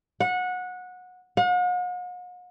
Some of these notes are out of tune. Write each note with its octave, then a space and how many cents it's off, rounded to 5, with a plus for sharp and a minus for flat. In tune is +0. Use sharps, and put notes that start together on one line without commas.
F#5 -20
F#5 -45